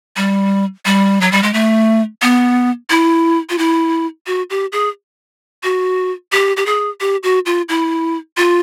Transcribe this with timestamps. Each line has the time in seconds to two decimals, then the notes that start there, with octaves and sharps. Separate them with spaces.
0.17 G3
0.85 G3
1.21 F#3
1.32 G3
1.43 G#3
1.53 A3
2.22 B3
2.90 E4
3.50 F4
3.58 E4
4.27 F#4
4.50 G4
4.72 G#4
5.64 F#4
6.32 G4
6.57 G4
6.66 G#4
7.01 G4
7.23 F#4
7.46 F4
7.69 E4
8.37 F4